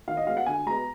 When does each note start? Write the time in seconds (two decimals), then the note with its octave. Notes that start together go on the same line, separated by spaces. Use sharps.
0.08 D#3 F5
0.17 D#5
0.27 G#3 B3 F5
0.37 F#5
0.46 D3 G#5
0.66 G#3 B3 A#5